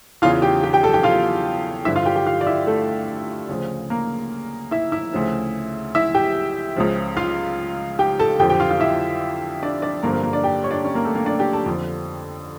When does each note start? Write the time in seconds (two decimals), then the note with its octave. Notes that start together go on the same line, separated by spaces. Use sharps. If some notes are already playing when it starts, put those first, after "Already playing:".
0.22 E2 C#3 E3 F4 F5
0.42 G4 G5
0.63 G4 G5
0.73 G4 G5
0.83 A4 A5
0.93 G4 G5
1.03 F4 F5
1.85 G2 D3 F3 E4 E5
1.96 F4 F5
2.06 G4 G5
2.16 G4 G5
2.26 F4 F5
2.41 D5
2.47 E4 E5
2.67 A3 A4
3.49 D2 C#3 F3
3.90 A#3 A#4
4.71 E4 E5
4.92 E4 E5
5.13 D2 C#3 F3
5.95 E4 E5
6.14 G4 G5
6.76 C#2 C#3 F3
7.17 F4 F5
7.99 G4 G5
8.19 A4 A5
8.39 F2 D3 F3 G4 G5
8.50 G4 G5
8.60 F4 F5
8.71 F4 F5
8.80 E4 E5
9.62 D4 D5
9.82 D4 D5
10.03 G2 D3 F3 A#3 A#4
10.13 A#3 A#4
10.23 A#3 A#4
10.33 D4 D5
10.44 G4 G5
10.64 C#5
10.71 D4 D5
10.84 C#4 C#5
10.95 A#3 A#4
11.05 A3 A4
11.15 A#3 A#4
11.25 D4 D5
11.39 G4 G5
11.53 A4 A5
11.66 F2 D3 F3